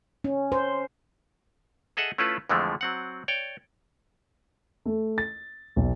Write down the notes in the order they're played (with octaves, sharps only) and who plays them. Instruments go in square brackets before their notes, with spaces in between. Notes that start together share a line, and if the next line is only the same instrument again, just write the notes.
[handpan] C#4
C5
[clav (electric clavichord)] G#4 A4 D#5 E5 F#5
A3 C#4 E4 F4 A4 B4
F2 D3 E3 F3 G#3 A3
F#3 C4 F#5
C#5 D5 G5
[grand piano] A3
A6
B1